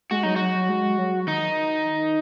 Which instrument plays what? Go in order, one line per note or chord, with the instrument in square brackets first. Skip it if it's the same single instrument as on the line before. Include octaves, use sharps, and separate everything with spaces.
[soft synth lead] G#3 [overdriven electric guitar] F#4
[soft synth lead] F#3 [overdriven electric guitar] D#4
[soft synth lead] F#3 [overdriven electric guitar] F#4
[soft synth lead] F#3
G#3
F#3
[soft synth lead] D#3 [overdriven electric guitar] D#4
[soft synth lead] D#3